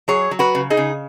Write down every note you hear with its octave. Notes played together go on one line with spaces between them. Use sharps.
F#3 G#4 C#5
F#3
F#4 B4
C#3
D#4 G#4
C#3